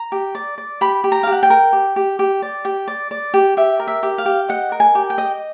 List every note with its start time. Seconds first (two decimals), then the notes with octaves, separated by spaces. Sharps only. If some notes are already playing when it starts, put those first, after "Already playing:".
Already playing: A#5
0.12 G4
0.35 D5
0.58 D5
0.81 G4 B5
1.04 G4
1.12 A#5
1.23 F5
1.27 G4
1.32 F#5
1.43 G5
1.50 A#4
1.73 G4
1.96 G4
2.19 G4
2.42 D5
2.65 G4
2.88 D5
3.11 D5
3.34 G4
3.57 G4 E5
3.80 A#4
3.87 E5
4.03 G4
4.18 F5
4.25 G4
4.48 D#5 F#5
4.72 A#4
4.80 G#5
4.95 G4
5.10 G5
5.18 D#5